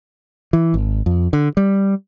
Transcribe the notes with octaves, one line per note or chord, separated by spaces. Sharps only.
E3
G#1
F2
D3
G3